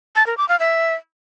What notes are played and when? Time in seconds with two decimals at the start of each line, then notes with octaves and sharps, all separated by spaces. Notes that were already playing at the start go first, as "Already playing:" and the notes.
0.16 A5
0.27 A#4
0.38 D6
0.49 F5
0.60 E5